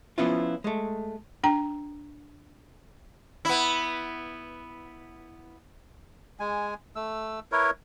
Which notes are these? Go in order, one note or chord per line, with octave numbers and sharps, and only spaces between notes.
F3 B3 C#4 E4 F4
G#3 A3
D4 G5 A#5
B3 E4
G#3 G#5
A3 E6
E4 A#4 B4 C#5